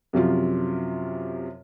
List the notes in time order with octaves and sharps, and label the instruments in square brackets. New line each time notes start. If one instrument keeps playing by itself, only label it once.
[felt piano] F#2 C3 F3 F4